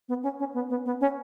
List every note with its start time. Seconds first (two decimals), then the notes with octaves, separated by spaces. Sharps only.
0.09 B3
0.23 C#4
0.39 C#4
0.54 B3
0.70 B3
0.85 B3
1.01 C#4